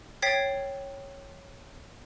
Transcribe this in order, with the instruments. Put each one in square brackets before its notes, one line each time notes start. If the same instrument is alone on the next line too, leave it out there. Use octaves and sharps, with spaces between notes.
[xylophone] C#5 G5 G#6 A6 B6 C7